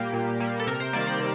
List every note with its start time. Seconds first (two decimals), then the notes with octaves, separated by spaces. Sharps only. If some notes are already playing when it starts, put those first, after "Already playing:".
Already playing: A#2 G3 A#3 G4
0.13 A#2
0.40 G3 A#3
0.59 A4
0.67 C3 A#4
0.80 C5
0.93 D#3 G3 A#3 D5
1.07 C5
1.20 C3